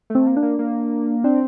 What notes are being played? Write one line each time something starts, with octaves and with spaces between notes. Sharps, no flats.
A3
C4
A#3
D4
A#3
A#3
C4 D4